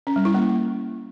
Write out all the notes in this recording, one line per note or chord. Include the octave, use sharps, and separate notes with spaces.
C#4
G3
E4
A#3